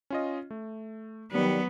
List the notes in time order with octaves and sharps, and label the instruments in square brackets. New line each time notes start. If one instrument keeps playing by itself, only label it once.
[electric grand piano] C#4 F4 D#5
A3
[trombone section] D#3 G3 [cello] F#3 B3